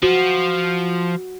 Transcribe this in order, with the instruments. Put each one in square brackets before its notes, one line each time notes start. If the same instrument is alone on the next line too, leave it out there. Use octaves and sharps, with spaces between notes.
[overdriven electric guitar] F3 [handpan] F#4